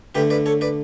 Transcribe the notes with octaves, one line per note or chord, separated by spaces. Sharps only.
D3 A3 G4 B4
B4 D5
A4 C#5
B4 D5